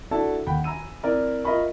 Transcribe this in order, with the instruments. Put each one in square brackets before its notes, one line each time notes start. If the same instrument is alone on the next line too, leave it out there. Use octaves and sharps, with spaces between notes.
[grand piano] D4 E4 F#4 A4 A5
D#2 F#5 G5 B5
G#5 A#5 B5 E6 D#7
C4 E4 A#4 D5 E5
F4 A#4 D#5 E5 B5 C#6